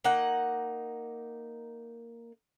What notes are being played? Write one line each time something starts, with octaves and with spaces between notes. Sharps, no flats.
A#3 D#4 F#5